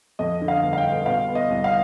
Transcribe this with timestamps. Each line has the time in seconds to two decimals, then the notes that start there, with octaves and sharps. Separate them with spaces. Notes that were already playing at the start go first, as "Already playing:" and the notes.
0.19 F2 D#5
0.41 D3
0.48 F5
0.63 G1
0.73 F5
0.78 G5
0.85 G1
1.06 B2 F5
1.28 B3
1.35 D#5
1.50 C2
1.64 F5